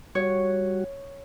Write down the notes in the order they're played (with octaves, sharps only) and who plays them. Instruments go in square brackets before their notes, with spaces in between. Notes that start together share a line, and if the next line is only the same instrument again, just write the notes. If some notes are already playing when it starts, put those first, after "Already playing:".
[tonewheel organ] G3 F#4 [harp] C#5